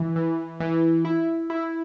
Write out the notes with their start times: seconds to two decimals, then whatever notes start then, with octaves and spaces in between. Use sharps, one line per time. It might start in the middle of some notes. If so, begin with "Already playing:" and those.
Already playing: E3
0.16 E3
0.60 E3
1.05 E4
1.50 E4